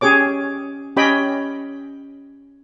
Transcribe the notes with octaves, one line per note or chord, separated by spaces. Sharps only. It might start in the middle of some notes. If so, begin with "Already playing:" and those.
C#4 G4 G#4 C#5 D6
C#4 G4 C#5 D#5 G5 B5